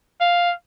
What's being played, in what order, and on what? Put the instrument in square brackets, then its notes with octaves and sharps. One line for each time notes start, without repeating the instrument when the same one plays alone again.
[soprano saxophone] F5